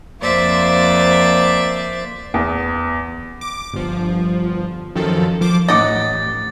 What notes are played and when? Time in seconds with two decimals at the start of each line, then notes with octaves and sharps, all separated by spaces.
0.21 F2 A#3 C5 D5 E5 A6
2.34 E2
3.41 D6
3.73 G1 F3
4.95 F#2 D#3 F3 A4
5.41 F3 C5 D6
5.69 A1 D#4 D#5 F#5 D6 A6